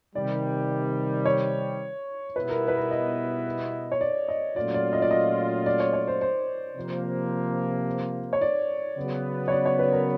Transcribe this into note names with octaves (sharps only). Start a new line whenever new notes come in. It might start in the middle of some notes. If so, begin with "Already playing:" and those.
C3 D#3 G3 D5
C#5
B2 G3 B3 E4 B4
A#4
B4
A#4
D#5
C#5
D5
D#5
A#2 F#3 A3 C#4 F4 D5
D5
D#5
D5
D#5
D5
C#5
C#5
C5
C5
C3 F3 A#3
C#5
D5
C#3 F#3 B3
C#5
D5
C#5
B4
A#4